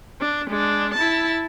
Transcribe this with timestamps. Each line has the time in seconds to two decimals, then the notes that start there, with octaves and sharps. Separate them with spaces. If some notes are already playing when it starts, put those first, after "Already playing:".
0.21 D4
0.50 G#3 D4
0.94 E4 A5